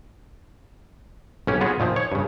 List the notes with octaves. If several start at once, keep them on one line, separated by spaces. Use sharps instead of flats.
B1 C#4 G4
B3 F4 F#4 G#4
A#2 D#3 F3
C#5
G2 C#3